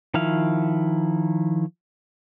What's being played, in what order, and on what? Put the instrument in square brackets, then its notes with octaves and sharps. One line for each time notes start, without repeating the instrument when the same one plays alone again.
[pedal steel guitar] D#3 F3 E4 F5